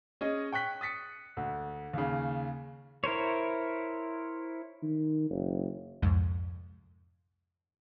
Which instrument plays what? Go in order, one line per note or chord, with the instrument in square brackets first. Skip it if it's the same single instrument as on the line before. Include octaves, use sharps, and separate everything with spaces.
[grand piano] C#4 G#4 D#5
G5 C#6 F#6 B6
D#6 A6 B6 C#7
D2
D#2 C#3
[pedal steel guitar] E4 A#4 C5 C#5
[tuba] D#3
F#1
[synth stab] C2 F2 G#2